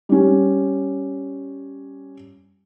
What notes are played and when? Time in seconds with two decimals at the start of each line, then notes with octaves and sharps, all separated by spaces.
0.09 G3 C#4